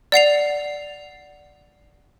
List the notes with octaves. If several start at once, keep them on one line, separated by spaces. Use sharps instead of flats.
D5 F#5 C7 F7